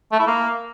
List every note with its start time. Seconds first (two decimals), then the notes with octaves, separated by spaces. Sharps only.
0.12 A3
0.20 E4
0.27 A#3